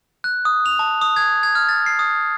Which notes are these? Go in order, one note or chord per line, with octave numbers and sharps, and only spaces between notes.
F#6
D#6
F7
A5
D#6
G#6
G#6
F6
A6
C7
D#6